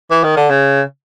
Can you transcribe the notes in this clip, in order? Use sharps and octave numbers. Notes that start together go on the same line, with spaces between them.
E3
D#3
D3
C#3